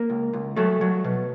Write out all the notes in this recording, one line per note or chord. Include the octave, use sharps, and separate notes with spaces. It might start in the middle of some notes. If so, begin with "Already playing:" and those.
Already playing: A#3 A#4
C#2
C#2
F#3 A3 A4
F#3
B2